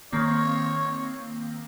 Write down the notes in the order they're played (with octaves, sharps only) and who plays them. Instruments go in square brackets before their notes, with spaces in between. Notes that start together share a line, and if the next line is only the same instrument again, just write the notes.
[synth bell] D#3 A#3 C4 [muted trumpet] C#5